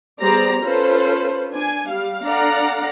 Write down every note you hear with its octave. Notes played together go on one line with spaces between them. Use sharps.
G3 B3 G#4 C5 D5 A#5
C#4 F4 A4 B4 C5
D4 G#5
G3 F5
D4 A4 D5 F5 F#5 A#5